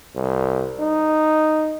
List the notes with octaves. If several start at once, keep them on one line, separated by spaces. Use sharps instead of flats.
C2
D#4